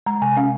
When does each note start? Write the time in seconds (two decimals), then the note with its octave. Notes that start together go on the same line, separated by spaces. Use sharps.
0.06 G#3 A#5
0.22 C3 G#5
0.37 C#4 F5